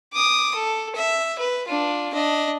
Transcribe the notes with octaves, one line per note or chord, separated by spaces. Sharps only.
D6 D#6
A4
E5
B4
D4 F4
D4 D#5